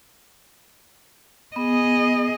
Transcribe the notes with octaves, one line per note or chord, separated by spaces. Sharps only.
B3 G#4 D#5